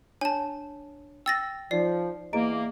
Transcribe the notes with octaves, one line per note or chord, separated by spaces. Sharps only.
D4 C#5 G#5 A5
G5 E6 A6 A#6
F3 D#4 D5 C7
E2 A#3 D#5 A#5 D7